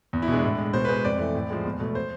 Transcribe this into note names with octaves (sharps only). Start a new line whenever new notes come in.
E2
E4
B2 G#3 D4
A2
G#3
B2 C5
B4
G#3 C5
F2 D5
E3 A3
A2
F3 G#3
E2
B2 A3
C5